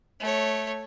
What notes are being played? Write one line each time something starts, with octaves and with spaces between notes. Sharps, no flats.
A3 C#5